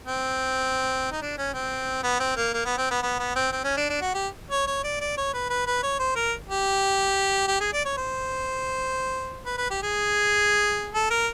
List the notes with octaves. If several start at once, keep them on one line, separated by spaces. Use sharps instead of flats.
C4
D#4
D4
C#4
C4
B3
C4
A#3
A#3
B3
C4
B3
B3
B3
C4
C4
C#4
D4
D4
F#4
G4
C#5
C#5
D5
D5
C#5
B4
B4
B4
C#5
C5
A#4
G4
G4
G#4
D5
C#5
C5
B4
B4
G4
G#4
A4
A#4